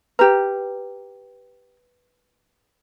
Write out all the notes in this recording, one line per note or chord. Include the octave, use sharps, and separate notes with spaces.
G4 B4 A#5